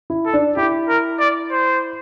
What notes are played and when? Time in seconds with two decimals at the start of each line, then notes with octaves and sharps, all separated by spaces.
0.10 E4
0.25 A4
0.33 D4
0.57 E4 G4
0.89 A#4
1.20 D5
1.52 C5